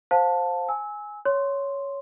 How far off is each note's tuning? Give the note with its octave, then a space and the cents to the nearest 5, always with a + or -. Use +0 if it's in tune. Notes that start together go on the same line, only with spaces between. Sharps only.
C5 +0 F5 +30 A5 +0
G#5 +0 E6 -25
C#5 +5 C6 +0